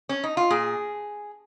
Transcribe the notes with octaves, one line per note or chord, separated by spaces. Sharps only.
C#4
D#4
F4
A#2 G#4